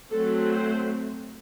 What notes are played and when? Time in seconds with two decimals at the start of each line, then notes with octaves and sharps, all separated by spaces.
0.11 F#3 A3 C4 A4
0.51 C5